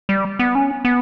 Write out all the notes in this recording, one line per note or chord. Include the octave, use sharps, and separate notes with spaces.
G3
B3
C#4
B3